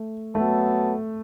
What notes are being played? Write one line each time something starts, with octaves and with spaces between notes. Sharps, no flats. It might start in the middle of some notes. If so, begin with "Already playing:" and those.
Already playing: A3
F#3 A3 B3 A4